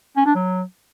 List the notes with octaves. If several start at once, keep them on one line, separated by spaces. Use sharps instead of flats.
C#4
D4
F#3